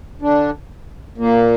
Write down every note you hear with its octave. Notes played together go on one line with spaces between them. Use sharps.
D3 D4
A#2 A#3